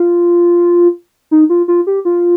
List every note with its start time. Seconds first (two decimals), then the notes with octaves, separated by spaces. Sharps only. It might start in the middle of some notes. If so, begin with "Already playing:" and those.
Already playing: F4
1.31 D#4
1.50 F4
1.68 F4
1.87 G4
2.05 F4